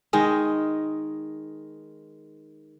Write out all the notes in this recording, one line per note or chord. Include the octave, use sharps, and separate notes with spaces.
D#3 G#3 D#5